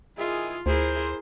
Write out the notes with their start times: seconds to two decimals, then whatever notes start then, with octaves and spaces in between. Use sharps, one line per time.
0.18 D#3 E4 F4 G#4
0.66 D2 E4 G#4 A#4 C5